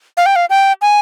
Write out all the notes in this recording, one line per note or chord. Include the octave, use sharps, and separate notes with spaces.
F5
G5
F5
G5
G#5